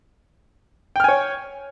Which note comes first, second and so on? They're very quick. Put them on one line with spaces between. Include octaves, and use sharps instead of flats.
G5 F6 G#5 C#5